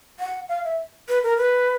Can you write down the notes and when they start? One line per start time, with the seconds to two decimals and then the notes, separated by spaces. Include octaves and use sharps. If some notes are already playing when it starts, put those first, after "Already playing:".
0.20 F#5
0.49 F5
0.64 E5
1.09 B4
1.23 A#4
1.38 B4